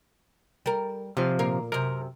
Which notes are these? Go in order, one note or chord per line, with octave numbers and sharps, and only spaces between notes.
G3 A#4
C3 F3 F4
A#2 A#4 F5
F#2 C3 A#4